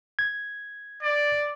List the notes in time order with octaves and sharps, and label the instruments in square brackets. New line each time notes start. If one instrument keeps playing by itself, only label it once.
[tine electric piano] G#6
[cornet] D5